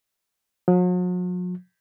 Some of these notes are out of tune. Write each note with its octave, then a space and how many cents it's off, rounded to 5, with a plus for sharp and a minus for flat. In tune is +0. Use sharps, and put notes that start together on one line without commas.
F#3 -45